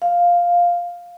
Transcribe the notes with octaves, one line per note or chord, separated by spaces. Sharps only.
F5